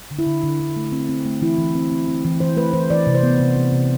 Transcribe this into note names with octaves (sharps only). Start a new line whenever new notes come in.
D3
E4
D3
D3
D3
A3
C4
C4
A3
E3 E4
E3
C4
C4
C4
E3
E3 C5
A3 B4
E3 C5
E3 D5
C3
C5
B3
C3
C3
C3